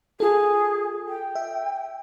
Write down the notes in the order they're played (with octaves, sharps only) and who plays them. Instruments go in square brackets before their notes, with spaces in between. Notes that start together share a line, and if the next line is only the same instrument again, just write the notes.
[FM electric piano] F4 A4 [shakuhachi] G#4
[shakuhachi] G5
[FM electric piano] E5